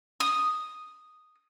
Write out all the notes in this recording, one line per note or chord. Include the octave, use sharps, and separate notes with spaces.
D#6